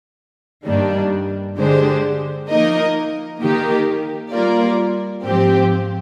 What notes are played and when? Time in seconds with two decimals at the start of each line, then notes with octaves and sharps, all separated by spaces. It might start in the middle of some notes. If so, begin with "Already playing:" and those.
0.66 G2 D#3 G3 A#3 D4
1.58 D3 G#3 D4 G4 C5
2.50 F3 A#3 D#4 A#4 D#5
3.41 D#3 A#3 D#4 G4 A#4
4.33 G3 A#3 F4 A#4 D5
5.25 G#2 F3 C4 G4